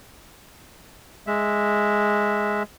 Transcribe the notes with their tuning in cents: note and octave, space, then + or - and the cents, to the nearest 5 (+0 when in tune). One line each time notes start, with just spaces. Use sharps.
G#3 +0 E5 +0